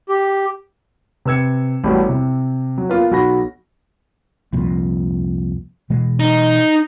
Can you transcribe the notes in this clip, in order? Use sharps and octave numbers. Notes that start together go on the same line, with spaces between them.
G4
C3 B4 E6 G#6 C#7
A1 A2 G3 A3 B3 F#4
C3
F#3
A#3 B3 F4 B4
B1 F#4 B5 A#6
C2 F2 A#2
B2 E3 G#3
D#4